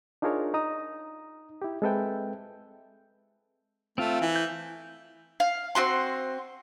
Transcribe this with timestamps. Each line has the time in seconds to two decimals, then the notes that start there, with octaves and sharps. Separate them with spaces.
0.22 D4 D#4 F4 G#4 A#4 C#5
0.54 D#4 A#5 D#6
1.62 E4 G4
1.82 G#3 C4 A4 B4 E5 G5
3.98 A3 C4 F4
4.21 E3
4.36 G6
5.40 F5
5.75 C4 D#4 F#4 C6